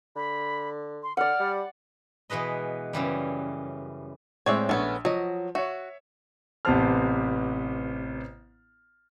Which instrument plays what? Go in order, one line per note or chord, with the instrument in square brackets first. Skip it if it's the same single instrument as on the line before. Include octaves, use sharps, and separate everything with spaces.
[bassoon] D3 [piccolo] B5
[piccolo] C6
[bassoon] D3 [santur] D5 F#5 [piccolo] F6
[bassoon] G3
[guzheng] B2 E3 G#3 B4 D#5
F#2 C#3 E3 G3
[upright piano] A2 G#3 C4 [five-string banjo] C#5 D5 E5
[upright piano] A#1 [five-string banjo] A3 B3 C#4
[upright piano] F3 [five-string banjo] F#3 D#5
[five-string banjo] F#4 [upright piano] C#5 E5
[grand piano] A1 C3 B3 C5 A5 F6